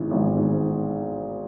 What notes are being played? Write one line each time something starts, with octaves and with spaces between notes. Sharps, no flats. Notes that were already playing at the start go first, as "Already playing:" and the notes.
Already playing: G#1 G#2 E3
G#1
G#2